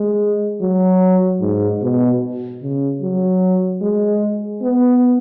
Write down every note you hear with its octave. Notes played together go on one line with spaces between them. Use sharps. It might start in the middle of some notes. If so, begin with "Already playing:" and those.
Already playing: G#3
F#3
G#2
B2
C#3
F#3
G#3
B3